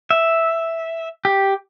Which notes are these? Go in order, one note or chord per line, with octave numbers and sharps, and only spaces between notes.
E5
G4